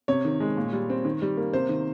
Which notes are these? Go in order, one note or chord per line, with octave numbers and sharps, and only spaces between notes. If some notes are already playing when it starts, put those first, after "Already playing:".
C3 C#5
D#3
G#3
A#2
G3
C4
D#3
G3
A#3
C3 C5
D#3